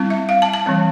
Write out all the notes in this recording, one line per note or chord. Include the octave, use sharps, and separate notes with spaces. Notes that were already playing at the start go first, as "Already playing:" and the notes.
Already playing: G3 C4 E4
E5
F5
A5
A5
E3 G3 C4